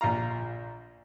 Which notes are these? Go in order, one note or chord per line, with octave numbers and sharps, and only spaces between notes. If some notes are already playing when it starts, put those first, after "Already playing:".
A#1 F4 F5 A#5